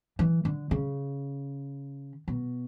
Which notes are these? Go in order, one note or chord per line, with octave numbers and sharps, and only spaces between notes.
E3
D3
C#3
B2